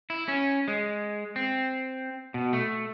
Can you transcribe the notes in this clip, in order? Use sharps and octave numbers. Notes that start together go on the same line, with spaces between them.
E4
C#4
G#3
C4
B2
A3